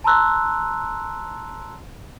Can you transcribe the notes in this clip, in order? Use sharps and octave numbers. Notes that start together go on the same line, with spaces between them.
A5 A#5 C6 E6 F#6